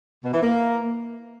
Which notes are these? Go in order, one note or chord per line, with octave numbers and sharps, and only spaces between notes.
B2
E3
A#3